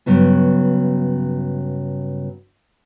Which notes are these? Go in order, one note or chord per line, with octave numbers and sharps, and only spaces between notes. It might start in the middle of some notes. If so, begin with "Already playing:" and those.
G2 C#3 F#3 B3